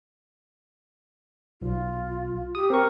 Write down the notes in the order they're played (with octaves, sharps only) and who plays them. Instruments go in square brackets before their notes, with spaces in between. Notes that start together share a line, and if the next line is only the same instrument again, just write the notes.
[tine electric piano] B1 [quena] F4
[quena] G4 [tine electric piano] D#6
[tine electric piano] C4 C#6 [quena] A#4